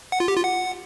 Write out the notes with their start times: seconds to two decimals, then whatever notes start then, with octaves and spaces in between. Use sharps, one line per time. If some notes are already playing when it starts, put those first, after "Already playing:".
0.12 F#5
0.20 F4
0.28 G4
0.36 F4
0.44 F#5